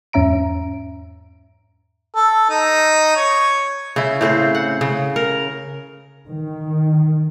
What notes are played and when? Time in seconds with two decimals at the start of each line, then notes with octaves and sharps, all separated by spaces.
0.13 E2 G#2 C#4 E5 A#5 D7
2.15 A4
2.49 D#4
3.16 C#5
3.96 C#3 E4
4.21 A2 C#3 C4 C5
4.55 F#5
4.81 C#3
5.16 A#4
6.26 D#3